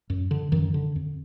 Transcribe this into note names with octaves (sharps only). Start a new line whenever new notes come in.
F#2
D3
F#2 D#3
D3
F2